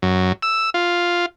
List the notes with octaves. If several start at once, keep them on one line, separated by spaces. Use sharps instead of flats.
F#2
E6
F4